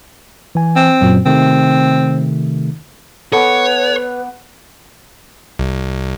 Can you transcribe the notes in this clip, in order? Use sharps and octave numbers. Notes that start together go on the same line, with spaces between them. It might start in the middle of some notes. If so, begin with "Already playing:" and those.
E3 G#5
C4
F#2 A#2 F#3
C3 D#3 A3 C4
B3 A4 B4 C#5 D6
C2